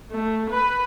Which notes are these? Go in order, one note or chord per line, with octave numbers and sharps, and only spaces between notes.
A3
B4